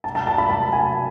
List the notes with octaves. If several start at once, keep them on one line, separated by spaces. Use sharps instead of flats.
A5
A5
A5
B5
A5
G#5